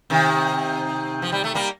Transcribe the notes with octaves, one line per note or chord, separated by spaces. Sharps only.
C3 D#3
F3
G3
A3
G3 A#3